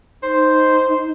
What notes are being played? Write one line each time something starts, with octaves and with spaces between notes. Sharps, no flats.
D#4 C5